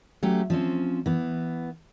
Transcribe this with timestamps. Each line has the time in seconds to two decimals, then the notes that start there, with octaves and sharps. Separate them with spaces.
0.23 F#3 A3 C#4 G4
0.50 F3 C4 C#4
1.06 E3 B3